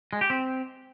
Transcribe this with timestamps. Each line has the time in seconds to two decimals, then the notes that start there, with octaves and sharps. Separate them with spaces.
0.13 G#3
0.21 G4
0.30 C4